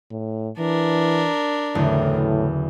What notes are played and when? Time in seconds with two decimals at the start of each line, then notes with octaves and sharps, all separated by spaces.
0.11 A2
0.58 E3 D4 A#4
1.75 F#1 E2 A2 D3